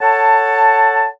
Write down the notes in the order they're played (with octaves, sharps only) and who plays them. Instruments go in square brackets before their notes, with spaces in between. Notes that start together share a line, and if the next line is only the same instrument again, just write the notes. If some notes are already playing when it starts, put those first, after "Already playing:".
[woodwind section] A4 C#5 F#5 A5